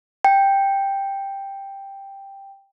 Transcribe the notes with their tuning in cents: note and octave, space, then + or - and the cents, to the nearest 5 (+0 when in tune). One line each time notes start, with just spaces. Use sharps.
G5 +5